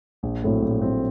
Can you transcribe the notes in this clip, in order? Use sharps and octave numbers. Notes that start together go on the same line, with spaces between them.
A#1
A2 F#3 A3 C4
A#1
A2 F#3 A3 C4